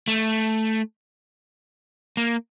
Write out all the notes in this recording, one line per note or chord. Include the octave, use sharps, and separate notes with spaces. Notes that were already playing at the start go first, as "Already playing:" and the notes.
A3
A#3